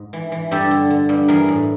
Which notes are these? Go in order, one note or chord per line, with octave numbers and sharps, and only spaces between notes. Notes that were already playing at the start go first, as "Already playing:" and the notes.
Already playing: G#2
E3
E3
G2 G4 A4
D3
D3
G2
E3 G#4 A#4
A2